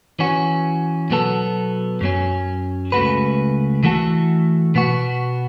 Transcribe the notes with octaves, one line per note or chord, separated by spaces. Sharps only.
E3 C#4 F#4
B2 F#3 B3 A4
F#2 F#3 C#4
C#2 C#3 A3 F#4 B4
E3 A3 F#4 A4
B2 B3 F#4